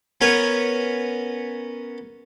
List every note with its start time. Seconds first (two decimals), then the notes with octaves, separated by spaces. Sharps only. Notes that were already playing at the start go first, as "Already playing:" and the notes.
0.21 B3 C#4 A#4 B4 G#5